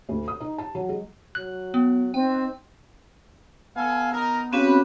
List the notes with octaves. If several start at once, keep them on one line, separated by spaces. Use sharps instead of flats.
D2
D#6
D#4
A5
F#3
G#3
F#3 F#6
B3
C4 D#4 G5
B3 A4 F5 G#5
D#4 A#4 A5
C#3 C4 C#4 F#4 G4 B4